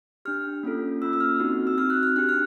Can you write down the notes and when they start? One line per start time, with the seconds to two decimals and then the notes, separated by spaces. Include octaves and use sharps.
0.25 D4 G4 F6
0.63 A#3 C#4 F4 A4
1.01 A#3 C#4 F4 A4 E6
1.13 E6
1.21 F6
1.40 C4 D#4 F#4
1.67 E6
1.78 C4 D#4 F#4 F6
1.90 F#6
2.03 F6
2.16 D4 G4 F#6
2.29 F6